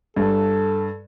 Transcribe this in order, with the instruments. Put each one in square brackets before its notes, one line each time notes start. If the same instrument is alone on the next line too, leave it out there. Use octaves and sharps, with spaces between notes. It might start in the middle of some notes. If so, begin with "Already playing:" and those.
[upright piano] G2 [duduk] A4